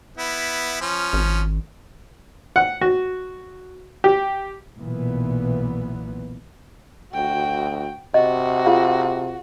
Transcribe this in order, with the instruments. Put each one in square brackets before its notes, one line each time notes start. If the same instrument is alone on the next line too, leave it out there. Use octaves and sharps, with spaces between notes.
[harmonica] B3 E4
F3 C#4
[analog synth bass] G#1
[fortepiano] F#5
F#4
G4
[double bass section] B1 A#2 E3 B3
[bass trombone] D2 [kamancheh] F#4 G5
[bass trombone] C3 [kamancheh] F#4 [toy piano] D#5
[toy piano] F4 G#4 F5